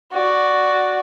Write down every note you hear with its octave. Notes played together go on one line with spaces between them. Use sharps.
F#4 D5